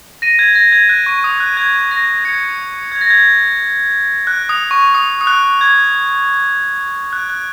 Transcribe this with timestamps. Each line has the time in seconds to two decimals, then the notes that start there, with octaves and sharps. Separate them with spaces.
0.22 A#6 D#7
0.39 G#6
0.55 A#6
0.72 G#6
0.89 F#6
1.06 C#6
1.24 D#6
1.40 F#6
1.57 G#6
1.91 A#6
2.25 G#6 C#7
2.92 G#6
3.01 A#6
3.10 G#6
4.27 F#6
4.49 D#6
4.71 C#6
4.94 D#6
5.21 D#6
5.27 F#6
5.61 G#6
7.13 F#6
7.30 F#6